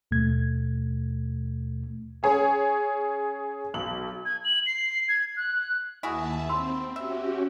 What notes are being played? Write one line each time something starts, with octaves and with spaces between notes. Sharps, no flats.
D#2 B2 A3 G#6
C#4 G#4 C#5
B1 F#7
G#6
F#7
C7
G#6
F#6
D#2 E4 F#4 G#4 E5 A5
C4 B5 C6 E6
C#4 F#4 G4 E5 E6